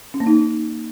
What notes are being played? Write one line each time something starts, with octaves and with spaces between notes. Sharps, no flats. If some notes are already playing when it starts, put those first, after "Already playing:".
C#4
A#3
D#4